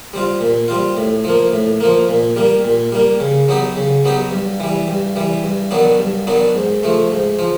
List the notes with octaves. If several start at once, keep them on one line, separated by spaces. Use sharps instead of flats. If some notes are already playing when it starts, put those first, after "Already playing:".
G3 C4 F4
A#2
G3 C4 F4
A2
F3 A#3
A2
F3 A#3
A#2
G3 A#3
A#2
G3 A#3
C#3
F#3 B3 D#4 G4
C#3
F#3 B3 D#4 G4
G2
E3 G3
G2
E3 G3
G2
D#3 F#3 B3 D4
G2
D#3 F#3 B3 D4
G#2
F3 A3
G#2
F3